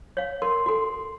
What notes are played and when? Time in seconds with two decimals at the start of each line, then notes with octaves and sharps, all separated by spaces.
0.17 C#5 F5
0.42 A#4 C6
0.66 F#4 A4